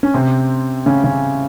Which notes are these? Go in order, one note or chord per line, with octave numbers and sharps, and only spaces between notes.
C#4
C3 C4
C#3 C#4
C#3 C#4